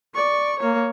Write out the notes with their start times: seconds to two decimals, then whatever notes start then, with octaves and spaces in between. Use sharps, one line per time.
0.14 D5 C#6
0.59 A#3 C#5